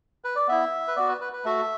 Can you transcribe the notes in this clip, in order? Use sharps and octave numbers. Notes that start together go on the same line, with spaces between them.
B4
D5
B3 E4 E5
B4
B3 F#4 D5
B4
B4
B4
A3 F#4 E5